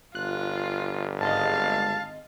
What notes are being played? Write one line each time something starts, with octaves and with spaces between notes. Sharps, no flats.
G1 F4 F#6
G#1 G#3 D#5 F5 A5